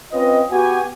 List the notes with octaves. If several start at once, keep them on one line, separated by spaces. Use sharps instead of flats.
C4 C#4 F4 B4 D#5
B3 F#4 G4 G#5